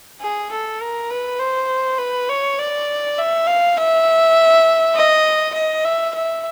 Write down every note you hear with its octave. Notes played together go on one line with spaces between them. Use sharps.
G#4
A4
A#4
B4
C5
B4
C#5
D5
E5
F5
E5
D#5
D#5
E5
E5